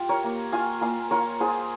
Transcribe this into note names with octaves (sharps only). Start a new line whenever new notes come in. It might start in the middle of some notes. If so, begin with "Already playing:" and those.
Already playing: F4 G4
A#4 C#5
A#3
F4 F5 G#5
A#3 F5 G#5
F4 A#4 C#5
F4 G#4 C5